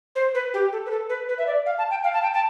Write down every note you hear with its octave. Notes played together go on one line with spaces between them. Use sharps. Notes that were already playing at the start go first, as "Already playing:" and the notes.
C5
B4
G4
A4
B4
A4
B4
B4
E5
D5
F5
A5
G5
F5
A5
G5
A5